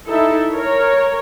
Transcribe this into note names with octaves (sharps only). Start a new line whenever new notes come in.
D#4 E4 A4 E5
A#4 C#5